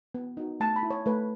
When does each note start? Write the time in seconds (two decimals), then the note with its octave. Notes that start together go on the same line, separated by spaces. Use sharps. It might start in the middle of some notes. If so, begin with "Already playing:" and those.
0.14 B3
0.37 D#4 F#4
0.60 A3 A5
0.76 B5
0.83 E4
0.90 C#5
1.06 A3 B4